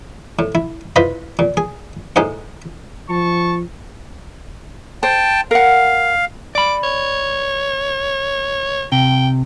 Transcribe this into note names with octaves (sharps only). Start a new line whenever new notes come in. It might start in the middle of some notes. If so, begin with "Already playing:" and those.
A2
E4
E4 F4 B4 C5 D#5
A#2
G#4
A2 D#4 G#4 C5 F#5
F3 A5 C#6
C5 G5 A5
A#4 F5 F#5
D5 B5 D6
C#5
C3 G5